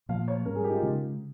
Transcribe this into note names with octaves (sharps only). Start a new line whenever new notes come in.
A#2 F3 A#3 F5
C#5
G#2 G3 C#4 A#4
G#4
G4
D#4
F4
C#3 G#3 C#4